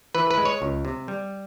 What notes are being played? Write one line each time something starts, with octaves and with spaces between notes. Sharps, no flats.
E3 B4
B4
G#3
C#5
C#2
C3
G3